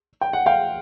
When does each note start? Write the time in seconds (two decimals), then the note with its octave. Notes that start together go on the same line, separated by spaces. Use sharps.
0.21 G5
0.33 F#5
0.46 F5 G5